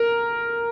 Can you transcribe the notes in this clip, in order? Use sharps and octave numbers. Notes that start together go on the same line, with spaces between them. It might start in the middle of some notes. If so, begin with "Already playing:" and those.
Already playing: A#4